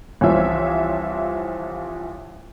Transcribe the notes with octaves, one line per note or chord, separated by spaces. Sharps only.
C2 E3 F3 F4 C#5 E5